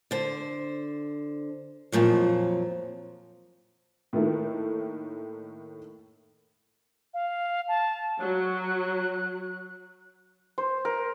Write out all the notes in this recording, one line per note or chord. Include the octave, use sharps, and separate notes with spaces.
D3 C5
F2 A#2 F3 F#3
A2 D#3 A3 A#3
F5
A5
F#3 F#6
C5
A#4